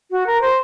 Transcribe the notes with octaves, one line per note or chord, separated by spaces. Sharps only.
F#4
A#4
C5